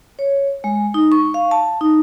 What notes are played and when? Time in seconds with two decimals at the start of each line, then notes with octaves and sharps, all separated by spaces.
0.19 C#5
0.64 G#3
0.94 D#4
1.12 C#6
1.34 F5
1.51 A5
1.81 D#4